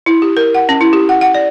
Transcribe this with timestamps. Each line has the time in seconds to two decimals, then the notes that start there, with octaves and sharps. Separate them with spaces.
0.06 E4
0.22 G4
0.37 A#4
0.55 F#5
0.69 C#4
0.81 E4
0.93 G4
1.09 F#5
1.21 F#5
1.34 D5